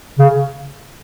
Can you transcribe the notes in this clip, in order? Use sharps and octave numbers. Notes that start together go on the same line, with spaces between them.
C#3